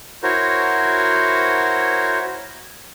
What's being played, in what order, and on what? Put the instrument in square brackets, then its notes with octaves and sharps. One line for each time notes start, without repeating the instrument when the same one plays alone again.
[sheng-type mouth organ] E4 F#4 A#4 C5 C#5